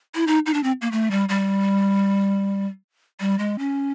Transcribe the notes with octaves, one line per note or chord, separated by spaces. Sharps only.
E4
D#4
D#4
D4
C4
A#3
A3
G3
G3
G3
G#3
C#4